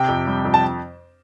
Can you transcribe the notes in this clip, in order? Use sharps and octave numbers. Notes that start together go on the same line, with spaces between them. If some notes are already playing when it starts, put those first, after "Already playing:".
Already playing: C3 G5
F2
G3
F2
A5